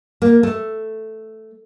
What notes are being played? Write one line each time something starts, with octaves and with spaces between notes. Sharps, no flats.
A#3
A3